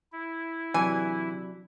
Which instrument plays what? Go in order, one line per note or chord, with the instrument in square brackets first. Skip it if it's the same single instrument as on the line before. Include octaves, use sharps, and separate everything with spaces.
[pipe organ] E4
[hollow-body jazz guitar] C3 F#3 D4 [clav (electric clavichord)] E3 [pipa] G#5